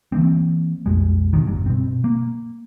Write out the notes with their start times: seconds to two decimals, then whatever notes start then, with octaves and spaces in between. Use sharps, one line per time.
0.12 E3 F3 A#3 C4
0.86 B1 F2 G#3
1.33 E2 B2 D#3
1.47 G1 G2
1.66 B2 C4
2.04 A#3